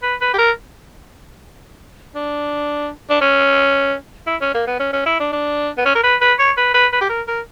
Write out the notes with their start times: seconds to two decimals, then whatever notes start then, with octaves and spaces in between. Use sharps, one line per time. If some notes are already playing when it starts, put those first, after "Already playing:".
0.02 B4
0.21 B4
0.34 G4
0.38 A#4
2.15 D4
3.10 D4
3.21 C#4
4.26 E4
4.41 C#4
4.54 A#3
4.67 B3
4.80 C#4
4.93 C#4
5.06 E4
5.20 D4
5.33 D4
5.78 B3
5.85 C#4
5.95 A#4
6.03 B4
6.21 B4
6.39 C#5
6.57 B4
6.74 B4
6.93 B4
7.01 G4
7.09 A#4
7.28 A#4